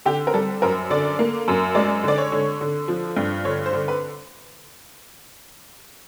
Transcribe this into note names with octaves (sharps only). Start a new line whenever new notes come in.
D3 G4
A#4
G3 A4
F#2 A#4
D3 D5
A#3
F#2
G#3 D5
D3 D5
C#5
D3
D3
F3
G2
D3 C#5
C5
D3
B4